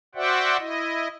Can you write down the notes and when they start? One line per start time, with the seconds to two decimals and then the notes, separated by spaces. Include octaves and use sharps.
0.15 F#4 C5 D5 E5 F#5 G5
0.59 E4 D#5